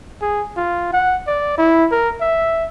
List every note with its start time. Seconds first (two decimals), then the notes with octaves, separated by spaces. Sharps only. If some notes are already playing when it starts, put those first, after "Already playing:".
0.22 G#4
0.57 F4
0.93 F#5
1.27 D5
1.58 E4
1.92 A#4
2.21 E5